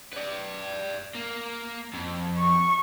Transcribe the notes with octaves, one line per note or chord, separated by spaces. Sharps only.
B4 D5
A#3
F2
C#6